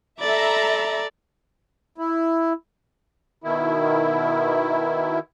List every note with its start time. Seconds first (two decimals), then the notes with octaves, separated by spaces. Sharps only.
0.20 A4 D5 E5 A#5 B5
1.98 E4
3.44 B2 D#3 E4